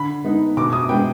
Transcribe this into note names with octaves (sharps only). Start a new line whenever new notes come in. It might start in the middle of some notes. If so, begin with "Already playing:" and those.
Already playing: D3 B5
G#3 B3 D#4
B2 D6
D#6
G#3 B3 G5